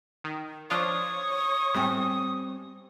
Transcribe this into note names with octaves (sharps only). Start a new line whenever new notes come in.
D#3
F3 D4 F4 C#5 C#6 D#6
A2 G3 C4 G#5